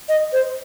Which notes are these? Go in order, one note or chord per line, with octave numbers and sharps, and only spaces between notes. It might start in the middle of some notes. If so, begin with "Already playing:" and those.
D#5
C5